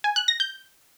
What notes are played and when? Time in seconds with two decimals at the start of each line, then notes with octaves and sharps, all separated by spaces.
0.04 G#5
0.16 F#6
0.28 A#6
0.40 G6